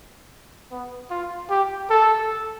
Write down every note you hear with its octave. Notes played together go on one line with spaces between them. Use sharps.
B3
F4
G4
A4